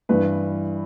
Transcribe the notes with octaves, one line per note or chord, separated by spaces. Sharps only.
G2 E3 B4